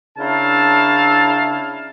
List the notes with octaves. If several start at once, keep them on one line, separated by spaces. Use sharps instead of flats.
C#3 D4 E4 A#4 F5 A5